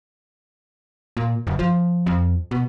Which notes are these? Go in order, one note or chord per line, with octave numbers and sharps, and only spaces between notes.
A#2
F#1
F3
F2
B2